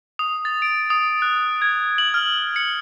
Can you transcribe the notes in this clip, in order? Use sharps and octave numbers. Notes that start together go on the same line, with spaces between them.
D#6
A6
D7
D#6
F#6
G#6
F#7
F6
C#7